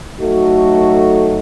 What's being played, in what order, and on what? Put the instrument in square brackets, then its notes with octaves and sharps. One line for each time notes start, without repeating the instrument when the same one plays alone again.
[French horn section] F#3 A3 D#4 F#4 A4